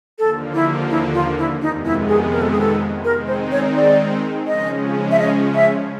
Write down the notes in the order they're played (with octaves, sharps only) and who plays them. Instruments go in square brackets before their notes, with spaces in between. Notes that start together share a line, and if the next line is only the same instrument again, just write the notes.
[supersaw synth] D#2 D3 F3 A#3 [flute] A4
[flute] E4
E4
F4
E4
[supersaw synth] F2 C3 D#3 G#3 B3 [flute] D#4
[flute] E4
G#4
A#4
A4
G#4
A4
[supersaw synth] D#3 G#3 C4 D#4 [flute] A#4
[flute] C5
C#5
D5
[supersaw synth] C#3 F3 G#3 C#4 [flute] D#5
[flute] E5
D#5
E5